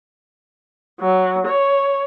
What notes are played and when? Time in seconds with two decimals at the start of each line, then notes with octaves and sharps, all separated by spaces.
1.00 F#3
1.46 C#5